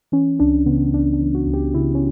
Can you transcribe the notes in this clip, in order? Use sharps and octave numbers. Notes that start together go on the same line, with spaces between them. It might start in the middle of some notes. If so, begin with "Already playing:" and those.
E3 C#4
C#2 D4
C#3 B3
C#2 D4
D4
E3
F#4
C#2
G4
C#3 E4
C#4